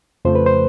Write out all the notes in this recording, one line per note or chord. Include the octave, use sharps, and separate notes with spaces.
F2 C#3 F3 A3 C5
B4
C5